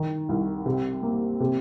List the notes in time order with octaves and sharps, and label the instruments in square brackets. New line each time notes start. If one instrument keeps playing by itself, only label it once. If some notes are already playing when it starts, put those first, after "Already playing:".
Already playing: [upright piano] D#3
C2
C3
A#3
C3